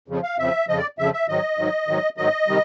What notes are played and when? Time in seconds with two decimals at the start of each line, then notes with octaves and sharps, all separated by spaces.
0.08 F2 C#3 F3
0.23 F5
0.38 F2 C#3 F3 E5
0.68 F2 C#3 F3 D#5
0.78 D5
0.99 F2 C#3 F3 E5
1.13 E5
1.28 G#2 D#3 F#3 D#5
1.58 G#2 D#3 F#3
1.88 G#2 D#3 F#3
2.17 G#2 D#3 F#3 D#5
2.48 C3 D#3 G3